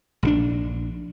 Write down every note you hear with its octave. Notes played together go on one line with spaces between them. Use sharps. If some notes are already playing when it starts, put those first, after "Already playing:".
A#1 D3 D4